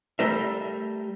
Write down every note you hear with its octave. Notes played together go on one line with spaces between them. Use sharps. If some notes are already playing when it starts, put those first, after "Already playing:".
G3 A3 A#4 E5